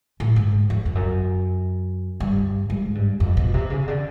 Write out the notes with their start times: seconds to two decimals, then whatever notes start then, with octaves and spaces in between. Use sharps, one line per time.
0.20 A2
0.36 G#2
0.70 F2
0.85 F2
0.95 F#2
2.20 G2
2.70 G#2
2.95 G2
3.20 F2
3.37 B2
3.54 C3
3.70 C#3
3.88 D3